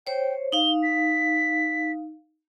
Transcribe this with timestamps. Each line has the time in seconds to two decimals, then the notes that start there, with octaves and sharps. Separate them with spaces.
0.07 C5 C#5 G5
0.52 D#4 F5 G7
0.83 B6